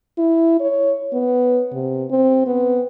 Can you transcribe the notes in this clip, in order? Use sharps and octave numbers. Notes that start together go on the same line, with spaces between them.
E4
C#5
B3
C3
C4
B3